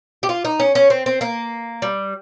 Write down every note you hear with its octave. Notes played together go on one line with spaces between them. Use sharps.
G4
F4
D#4
C#4
C#4
C4
C4
A#3
G3